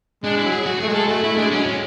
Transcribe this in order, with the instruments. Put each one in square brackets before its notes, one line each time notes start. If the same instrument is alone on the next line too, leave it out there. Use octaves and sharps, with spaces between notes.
[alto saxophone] G#3 [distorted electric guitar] D4
[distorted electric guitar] E4
[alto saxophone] F#3
[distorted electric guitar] G#4
F#4
[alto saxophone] A3 [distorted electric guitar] G#4
[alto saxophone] G#3
[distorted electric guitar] A4
[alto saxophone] A3 [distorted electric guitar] F#4
[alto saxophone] A3 [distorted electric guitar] E4
[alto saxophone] G#3 [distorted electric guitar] D4
[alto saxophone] F#3 [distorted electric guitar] C#4
[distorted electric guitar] G#3